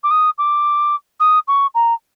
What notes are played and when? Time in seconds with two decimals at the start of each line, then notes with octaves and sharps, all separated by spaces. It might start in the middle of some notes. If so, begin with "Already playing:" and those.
0.03 D6
0.11 D#6
0.38 D6
1.20 D#6
1.48 C#6
1.75 A#5